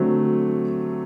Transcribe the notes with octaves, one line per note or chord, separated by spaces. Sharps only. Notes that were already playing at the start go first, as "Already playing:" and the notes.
Already playing: D3 F#3 A3 C4